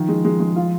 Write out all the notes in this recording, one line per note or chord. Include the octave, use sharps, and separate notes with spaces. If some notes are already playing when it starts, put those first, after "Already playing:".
Already playing: D#3 F3
G#3
G#3
G#3
F4